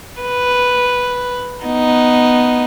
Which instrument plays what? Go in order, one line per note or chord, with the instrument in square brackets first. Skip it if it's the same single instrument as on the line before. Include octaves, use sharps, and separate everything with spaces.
[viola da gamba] B4
B3 D#4